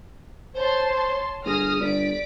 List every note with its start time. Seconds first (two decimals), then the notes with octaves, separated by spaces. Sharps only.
0.55 C5 C#5 A5 C6
1.45 G1 G#4 D#6 F6 A#6
1.80 G1 D5 B6 D7